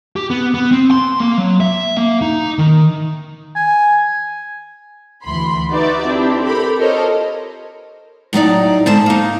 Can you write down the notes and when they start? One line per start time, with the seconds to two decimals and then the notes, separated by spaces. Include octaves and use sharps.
0.16 G4
0.30 B3
0.54 B3
0.71 C4
0.91 C6
1.20 A#3
1.38 F#3
1.60 E5
1.97 A#3
2.22 D#4
2.58 D#3
3.56 G#5
5.24 D2 E3 B5 C6
5.69 D#4 F#4 G4 B4 D5 E5
6.07 C4 D4 E4 G4
6.44 G4 A4 A#4 B5
6.77 F4 A4 A#4 C5 C#5 D#5
8.33 A2 F#3 D#4 D5
8.86 G#2 D3 C5 A5
9.06 A#3 D#4